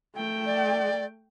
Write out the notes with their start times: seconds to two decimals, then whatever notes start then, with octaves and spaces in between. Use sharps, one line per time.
0.16 A3 G5
0.46 D5